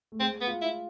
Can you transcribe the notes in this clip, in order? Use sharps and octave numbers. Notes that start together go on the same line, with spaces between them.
A3
G#3 C4
B3
F4
E4